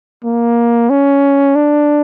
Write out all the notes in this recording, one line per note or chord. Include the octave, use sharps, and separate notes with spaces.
A#3
C#4
D4